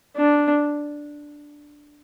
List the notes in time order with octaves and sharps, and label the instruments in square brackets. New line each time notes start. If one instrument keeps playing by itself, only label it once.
[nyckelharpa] D4